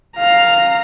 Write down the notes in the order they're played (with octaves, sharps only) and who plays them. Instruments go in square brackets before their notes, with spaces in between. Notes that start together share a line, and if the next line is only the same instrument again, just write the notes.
[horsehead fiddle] F5 A#5